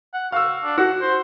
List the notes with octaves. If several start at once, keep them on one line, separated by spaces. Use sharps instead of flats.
F#5
F#4 F5 E6
D4
F#4 F#5
C5